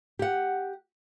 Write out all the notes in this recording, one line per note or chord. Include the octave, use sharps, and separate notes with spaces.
G4 F#5